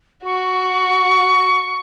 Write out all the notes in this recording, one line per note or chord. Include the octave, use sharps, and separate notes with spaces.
F#4 C#6